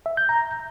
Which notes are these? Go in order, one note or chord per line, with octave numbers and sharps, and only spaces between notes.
E5
G6
A#5